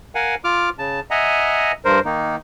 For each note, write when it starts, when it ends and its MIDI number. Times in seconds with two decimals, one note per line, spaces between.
0.15 0.35 70
0.15 0.35 77
0.15 0.35 78
0.15 0.35 80
0.44 0.69 65
0.44 0.69 86
0.44 0.69 89
0.79 1.00 49
0.79 1.00 81
1.11 1.72 75
1.11 1.72 76
1.11 1.72 78
1.11 1.72 80
1.11 1.72 82
1.85 1.99 43
1.85 1.99 70
1.85 1.99 72
2.05 2.36 51
2.05 2.36 58
2.05 2.36 63